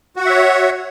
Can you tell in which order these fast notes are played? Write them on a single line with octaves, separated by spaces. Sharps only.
F#4 F#5 E5 C#5